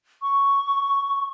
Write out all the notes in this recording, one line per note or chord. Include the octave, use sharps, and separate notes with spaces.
C#6